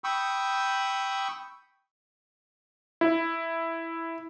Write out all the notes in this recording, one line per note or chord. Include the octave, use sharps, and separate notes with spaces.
G5 B5 C#6 D#6 E6
E4